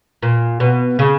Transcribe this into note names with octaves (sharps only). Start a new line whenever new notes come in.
A#2
B2
C#3